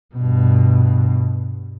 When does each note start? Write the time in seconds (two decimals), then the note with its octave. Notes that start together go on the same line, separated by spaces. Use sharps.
0.15 G2 B2